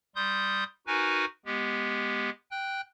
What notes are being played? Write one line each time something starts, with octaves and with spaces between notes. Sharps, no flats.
G3 C6 D#6 G6
D#4 F#4 A#4 B4 G#5
G#3 B3 G4
G5 F#6